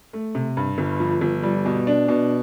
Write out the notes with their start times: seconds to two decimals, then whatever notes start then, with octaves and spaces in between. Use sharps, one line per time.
0.13 A3
0.35 C3
0.57 G2
0.78 G1
1.00 F3
1.21 G1
1.43 G3
1.66 B2
1.87 D4
2.08 B2